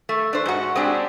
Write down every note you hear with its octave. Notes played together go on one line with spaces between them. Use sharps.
A3
D4 C5
G#2 F#4
G#3 C4 D4 G4